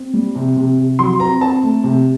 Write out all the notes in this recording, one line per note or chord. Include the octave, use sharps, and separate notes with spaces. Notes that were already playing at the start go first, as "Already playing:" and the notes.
Already playing: C4
G3
C3
C3
C3
F#3 C6
C4 A#5
C4 A5
A3
C3